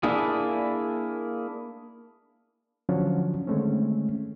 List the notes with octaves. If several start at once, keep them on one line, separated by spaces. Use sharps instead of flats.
A#3 D4 E4 G#4
D3 F3 F#3 C#4 D4 F4
D3 D#3 G#3 A3 C4 C#4